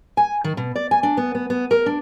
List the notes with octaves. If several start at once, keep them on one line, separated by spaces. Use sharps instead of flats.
G#5
D#3
B2
D5
G#5
D4
B3
B3
B3
A#4
D4